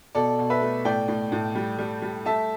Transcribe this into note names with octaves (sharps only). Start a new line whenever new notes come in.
B2 A4 D5
B2
B4 E5
A3
A2 D5 G5
A2
A2
G3
G3
G3
A3 E5 A5